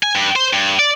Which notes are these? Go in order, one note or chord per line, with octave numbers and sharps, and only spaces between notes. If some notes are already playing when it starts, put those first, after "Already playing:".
G#5
G2
C5
G2
D5